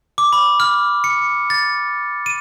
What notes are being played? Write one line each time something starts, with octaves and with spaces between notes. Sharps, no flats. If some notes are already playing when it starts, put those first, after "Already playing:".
D6
B5
F6
C#7
A6
D#7